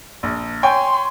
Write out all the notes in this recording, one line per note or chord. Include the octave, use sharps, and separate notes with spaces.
A#1
C#5 G5 G#5 C6